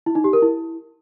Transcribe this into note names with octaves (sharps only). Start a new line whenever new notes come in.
E4
D#4
G4
A#4
E4